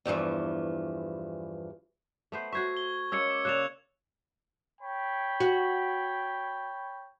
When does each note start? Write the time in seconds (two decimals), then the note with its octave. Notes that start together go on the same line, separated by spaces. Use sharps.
0.05 E2 G2 E3 F3
2.32 A3 B3 C5
2.53 F#4 C5 E5 C#6 G#6
2.77 G7
3.12 G#3 A#3 C#4 E6 G#6 C#7
3.30 D6
3.45 C#3 A#3 D5 F#6 E7 F7
4.81 C#5 G5 B5
5.40 F#4